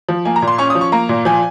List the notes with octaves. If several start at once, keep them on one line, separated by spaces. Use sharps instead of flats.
F3
A#3 G#5
A#5
A#2
C6
C#4 C#6
D#6
F3
C#6
A#3 A#5
A#2
F3 G#5